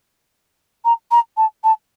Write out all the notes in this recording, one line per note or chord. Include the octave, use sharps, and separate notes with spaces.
A#5
A#5
A5
A5